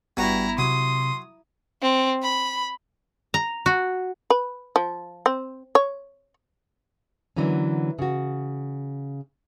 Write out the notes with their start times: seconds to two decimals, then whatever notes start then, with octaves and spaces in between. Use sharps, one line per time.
0.17 G#1 G2 B3 E4 F#4 A#5
0.58 C3 F#3 C6 D#6
1.82 C4
2.22 B5
3.34 A#5
3.66 F#4
4.30 B4
4.76 F3
5.26 C4
5.75 C#5
7.36 D3 E3 F#3 A#3 C#4
7.99 C#3 F#4